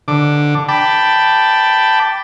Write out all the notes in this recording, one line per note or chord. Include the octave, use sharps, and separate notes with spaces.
D3 D6
G5 A5 B5 D6